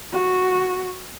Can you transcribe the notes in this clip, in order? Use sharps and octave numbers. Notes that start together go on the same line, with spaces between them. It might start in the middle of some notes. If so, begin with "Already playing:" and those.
F#4